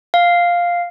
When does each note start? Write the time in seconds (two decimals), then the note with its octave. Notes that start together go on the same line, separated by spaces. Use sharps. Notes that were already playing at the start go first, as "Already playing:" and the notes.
0.14 F5